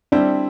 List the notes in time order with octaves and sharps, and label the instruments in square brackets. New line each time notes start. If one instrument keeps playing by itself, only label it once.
[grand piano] G3 C4 E4 [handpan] D4